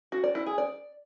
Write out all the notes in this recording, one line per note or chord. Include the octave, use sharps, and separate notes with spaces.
F#4
D5
E4
G#4
D5